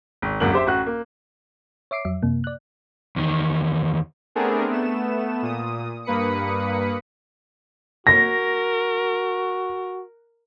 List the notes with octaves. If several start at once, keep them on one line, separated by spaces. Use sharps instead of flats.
G#1
G1 C#2 F#2 F#3 A#3 F#7
G4 C5 E5
A1 F#4 F#6
A#3
C#5 E5 D6 C7 D7
F2 F#3 E5
F#2 C3 A#3
D5 F#6
E2 D#3
A3 B3 C4 D4 G#4 A#4
A3 B3 E7
A#2 D#6
G2 A#3 B4 B5 D#6 C#7
F#4 A#4 A#6